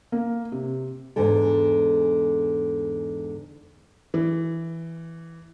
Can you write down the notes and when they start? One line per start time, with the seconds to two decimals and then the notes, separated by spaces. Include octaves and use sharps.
0.12 A#3
0.52 C3
1.16 E2 G#2 D3 A4
4.14 E3